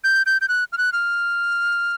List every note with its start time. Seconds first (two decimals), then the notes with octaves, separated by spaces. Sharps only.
0.04 G6
0.26 G6
0.41 G6
0.49 F#6
0.72 F6
0.78 F#6
0.93 F6